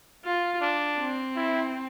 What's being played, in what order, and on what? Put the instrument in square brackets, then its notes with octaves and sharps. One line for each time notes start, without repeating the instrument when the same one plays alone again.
[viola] F4
[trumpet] D4
[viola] C4
[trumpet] E4